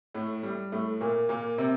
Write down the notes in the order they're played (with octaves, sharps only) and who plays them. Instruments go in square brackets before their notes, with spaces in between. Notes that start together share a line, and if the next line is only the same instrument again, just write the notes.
[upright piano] A2 A3
G3
A2 A3
A#2 A#3
A#2 A#3
C3 C4